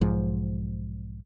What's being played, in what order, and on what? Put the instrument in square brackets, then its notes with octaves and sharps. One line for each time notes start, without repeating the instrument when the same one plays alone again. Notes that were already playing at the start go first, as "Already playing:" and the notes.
[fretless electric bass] B1 G#2 F3